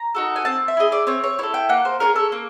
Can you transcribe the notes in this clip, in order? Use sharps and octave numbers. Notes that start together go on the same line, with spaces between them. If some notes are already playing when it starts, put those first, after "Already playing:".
Already playing: A#5
D#4 F#4 A4
G#5
C4 A5
E5
E4 G#4 D#5
D5
C4 C#5
C#5
E4 A4 C#5
G5
A#3 F#5
C5
C#4 F4 G#4 A#4
A4
A#3